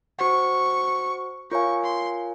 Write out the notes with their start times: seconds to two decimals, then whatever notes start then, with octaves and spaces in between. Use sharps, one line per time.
0.19 F#4 C5 F#5 C#6
1.51 F4 A#4 C#5 F5 G#5 C#6
1.84 C6